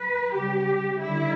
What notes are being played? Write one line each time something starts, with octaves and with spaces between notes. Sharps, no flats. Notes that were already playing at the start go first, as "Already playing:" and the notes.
Already playing: B4
C#3 G3 G4
D3 G3 E4